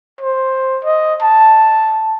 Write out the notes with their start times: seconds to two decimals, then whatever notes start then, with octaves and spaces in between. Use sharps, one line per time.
0.21 C5
0.84 D#5
1.21 A5